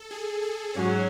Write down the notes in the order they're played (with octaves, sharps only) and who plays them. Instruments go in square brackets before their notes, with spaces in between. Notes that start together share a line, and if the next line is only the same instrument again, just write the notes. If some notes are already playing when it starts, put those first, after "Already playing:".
Already playing: [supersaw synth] A4
G#4
A4
[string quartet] G#2 F#3 C#4 [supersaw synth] G#4